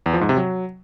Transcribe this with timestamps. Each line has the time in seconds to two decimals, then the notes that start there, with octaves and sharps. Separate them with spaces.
0.06 E2
0.14 F3
0.21 G#2
0.29 C3
0.37 F#3